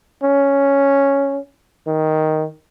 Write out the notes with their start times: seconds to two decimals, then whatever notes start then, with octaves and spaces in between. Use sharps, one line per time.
0.23 C#4
1.87 D#3